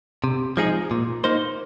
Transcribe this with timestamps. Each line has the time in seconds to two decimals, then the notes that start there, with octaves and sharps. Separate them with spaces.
0.24 C3
0.57 F3 G#3 D#4 G#4
0.91 A#2
1.24 A#3 D#4 C5